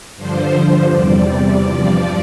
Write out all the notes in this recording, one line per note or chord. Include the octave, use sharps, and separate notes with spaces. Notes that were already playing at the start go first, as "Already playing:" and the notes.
G2 D3 F3 C5
C5
E2 C3 G3 D5
D5
G2 F3